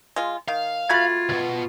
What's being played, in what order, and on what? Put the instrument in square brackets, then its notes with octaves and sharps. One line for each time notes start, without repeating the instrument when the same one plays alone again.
[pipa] G#3 F4
[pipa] D#3 [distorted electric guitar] F5
[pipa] A3 F#4 B5 [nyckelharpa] F4 [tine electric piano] G#6 A6
[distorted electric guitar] C#2 B2